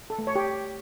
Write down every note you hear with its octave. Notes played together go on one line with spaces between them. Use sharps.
A4
A3
C#5
G4